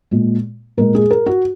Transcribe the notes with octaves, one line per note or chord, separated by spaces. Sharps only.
A#2 G#3
A#2 G#3 A#4
G#4
A#4
F#4